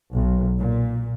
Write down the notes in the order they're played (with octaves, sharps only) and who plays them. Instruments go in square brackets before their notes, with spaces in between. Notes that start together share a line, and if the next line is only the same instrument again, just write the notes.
[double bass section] B1
A#2